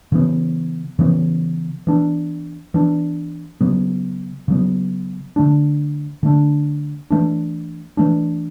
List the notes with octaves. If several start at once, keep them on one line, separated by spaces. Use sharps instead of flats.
C#3 E3 B3
C#3 E3 B3
E3 B3 D4
E3 B3 D4
C#3 F#3 B3
C#3 F#3 B3
D3 A3 D4
D3 A3 D4
E3 A3 D4
E3 A3 D4